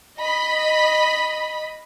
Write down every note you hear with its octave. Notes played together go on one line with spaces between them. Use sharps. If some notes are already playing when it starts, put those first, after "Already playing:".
D#5 B5